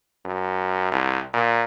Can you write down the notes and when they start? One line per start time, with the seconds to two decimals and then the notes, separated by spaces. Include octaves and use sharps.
0.25 F#2
0.92 C2
1.33 A#2